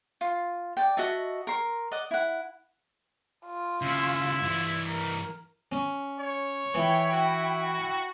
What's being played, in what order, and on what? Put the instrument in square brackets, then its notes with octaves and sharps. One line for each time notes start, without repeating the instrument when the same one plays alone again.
[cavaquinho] F4
D5 G5
F#4 D#5 E5 A5
A#4 C6
D5 D#5 F#5
E4 F#5
[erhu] F4
[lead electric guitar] D#2 C#3 [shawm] E4
[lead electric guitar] G2 E3
[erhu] A#4
[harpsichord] C#4
[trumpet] C#5
[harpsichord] E3 [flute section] E4 G5
[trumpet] F#4